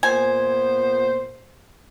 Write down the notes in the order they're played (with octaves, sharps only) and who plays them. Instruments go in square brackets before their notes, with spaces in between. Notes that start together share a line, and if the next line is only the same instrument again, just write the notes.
[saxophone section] A#2 B3 C5 [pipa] G#5